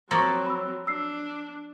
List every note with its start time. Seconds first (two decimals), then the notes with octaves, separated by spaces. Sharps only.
0.11 F3 F#3 A#3 C4 A4 A#5 C#6
0.46 B5 E6
0.87 D4 E6 C7